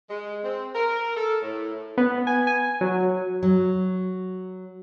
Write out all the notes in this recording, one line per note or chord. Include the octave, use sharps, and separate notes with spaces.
G#3
C4
A#4
A4
A2
B3
G#5
G#5
F#3
F#3